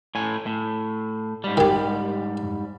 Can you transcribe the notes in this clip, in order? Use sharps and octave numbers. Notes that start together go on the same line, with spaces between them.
A2 G#5
A2
G#2 G3
D#3 G4